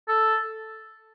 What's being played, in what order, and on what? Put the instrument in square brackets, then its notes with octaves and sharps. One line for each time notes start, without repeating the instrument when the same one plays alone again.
[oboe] A4